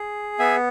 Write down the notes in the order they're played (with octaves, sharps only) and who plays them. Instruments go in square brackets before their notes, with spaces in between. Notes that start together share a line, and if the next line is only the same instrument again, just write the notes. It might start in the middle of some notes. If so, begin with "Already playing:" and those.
Already playing: [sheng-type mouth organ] G#4
B3 E5 G#5